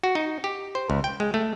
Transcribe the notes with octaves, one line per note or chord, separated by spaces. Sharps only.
F#4
D#4
G4
C5
C#2
G5
G#3
A3